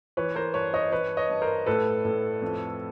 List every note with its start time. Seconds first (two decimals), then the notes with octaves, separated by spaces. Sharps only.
0.17 E3 B4 C#5
0.35 A#4 C5
0.54 G2 B4 C#5
0.74 C#5 D#5
0.92 E3 B4 C#5
1.17 C#5 D#5
1.30 G2
1.42 A#4 C5
1.66 A2 A4 B4
2.05 A2
2.42 F2